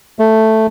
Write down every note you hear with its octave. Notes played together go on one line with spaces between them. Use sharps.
A3